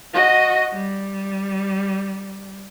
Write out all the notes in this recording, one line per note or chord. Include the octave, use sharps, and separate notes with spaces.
F#4 D#5
G3